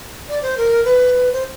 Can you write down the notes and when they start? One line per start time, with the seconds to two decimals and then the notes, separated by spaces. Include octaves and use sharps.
0.29 D5
0.42 C5
0.57 A#4
0.85 B4
1.32 C5